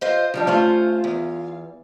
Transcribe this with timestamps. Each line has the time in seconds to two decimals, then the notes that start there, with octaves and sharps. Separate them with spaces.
0.01 F4 C5 D#5
0.34 D#3 F3 G3 D4
0.47 A3 C#4 F4 C5
1.04 E2